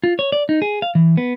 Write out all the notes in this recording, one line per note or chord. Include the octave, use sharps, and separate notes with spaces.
F4
C#5
D5
D#4
G#4
F5
E3
B3